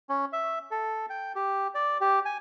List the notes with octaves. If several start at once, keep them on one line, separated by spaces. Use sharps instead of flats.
C#4
E5
A4
G5
G4
D5
G4
G#5